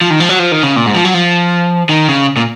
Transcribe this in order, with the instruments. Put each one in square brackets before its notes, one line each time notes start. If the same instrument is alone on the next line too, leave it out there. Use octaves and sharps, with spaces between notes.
[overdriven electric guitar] F3
D#3
F3
F#3
F3
D#3
C#3
A#2
G#2
F3
F#3
F3
D#3
C#3
A#2